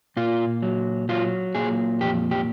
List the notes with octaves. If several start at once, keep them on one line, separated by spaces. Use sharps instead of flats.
A#2 F4
F#3
F#3 F4
A#2 G#4
F2 G4
G4